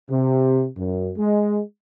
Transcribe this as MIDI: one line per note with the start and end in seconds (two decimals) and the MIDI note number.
0.11 0.67 48
0.78 1.13 42
1.18 1.61 56